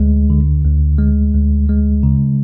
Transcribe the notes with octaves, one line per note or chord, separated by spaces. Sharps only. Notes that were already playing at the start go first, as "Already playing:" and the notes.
Already playing: D2 G#3
D3
D2
G#3
D2
G#3
C#3